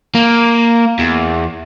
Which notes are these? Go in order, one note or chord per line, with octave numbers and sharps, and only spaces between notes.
A#3
E2